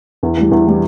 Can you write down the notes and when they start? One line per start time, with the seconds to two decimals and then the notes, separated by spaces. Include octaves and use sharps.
0.23 E2
0.37 E3 G3
0.51 E2
0.67 E3 G3